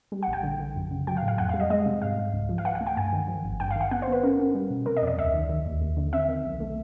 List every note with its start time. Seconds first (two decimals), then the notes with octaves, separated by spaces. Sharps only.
0.12 G3
0.23 F#5
0.28 A#1
0.33 G5
0.43 D3
0.59 D3
0.75 F#2
0.91 C#3
1.07 F#3 G5
1.17 F5
1.22 A2
1.28 F5
1.38 F2 F#5
1.49 F5
1.54 G3
1.60 D#5
1.70 G#3 D#5
1.86 C3
2.02 G#2 F5
2.18 G#2
2.33 C#2
2.49 F3
2.58 F5
2.65 E3 F#5
2.75 F#5
2.81 A3
2.87 G5
2.97 G2 G#5
3.13 D#3
3.28 F3
3.44 G#1
3.60 G2 G5
3.71 F5
3.76 D#3 F#5
3.91 B3 F#5
4.02 C5
4.08 B3 B4
4.23 C#4 A#4
4.39 C#4
4.55 G3
4.71 B2
4.86 C3 A#4
4.97 D#5
5.02 F2 D5
5.07 D#5
5.18 D2 E5
5.34 D#3
5.49 D#3
5.66 D#2
5.81 D#2
5.97 D3
6.13 C4 E5
6.28 D#3
6.44 B1
6.60 A3